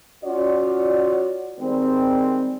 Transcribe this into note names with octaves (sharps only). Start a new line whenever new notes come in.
C#4 F4 F#4 C#5 D5
D#3 G3 G#3 C4